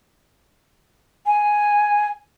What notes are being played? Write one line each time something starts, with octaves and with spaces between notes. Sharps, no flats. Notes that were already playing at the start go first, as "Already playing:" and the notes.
G#5